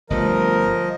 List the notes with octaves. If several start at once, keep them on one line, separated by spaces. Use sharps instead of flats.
G1 F3 G3 A3 A#4 D#5